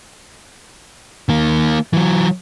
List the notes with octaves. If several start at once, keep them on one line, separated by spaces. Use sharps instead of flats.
D#3 A#3
E3 F#3